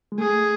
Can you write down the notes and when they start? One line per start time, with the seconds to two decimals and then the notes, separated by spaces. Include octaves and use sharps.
0.12 G#3
0.18 A3 G#4